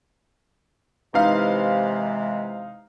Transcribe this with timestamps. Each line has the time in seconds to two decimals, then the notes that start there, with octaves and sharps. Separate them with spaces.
1.14 C3 E3 G#3 D#4 F5